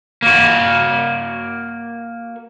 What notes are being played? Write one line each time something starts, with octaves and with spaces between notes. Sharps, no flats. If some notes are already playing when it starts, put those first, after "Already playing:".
A#3 F#4